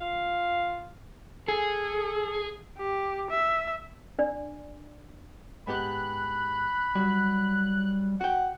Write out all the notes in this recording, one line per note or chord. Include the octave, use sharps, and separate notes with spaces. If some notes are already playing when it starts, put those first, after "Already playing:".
F4 F5
G#4 A4
G4
E5
D4 D5
G#2 B3 G4 B5 F#6
F#3 G3
F#4 F#5 G5